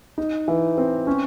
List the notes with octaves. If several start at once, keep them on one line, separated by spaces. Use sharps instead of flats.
D#4
E3
C4
C#4